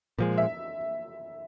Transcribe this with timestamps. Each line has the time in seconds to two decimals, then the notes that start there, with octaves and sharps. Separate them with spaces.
0.18 A#2 F3 G#3
0.38 E5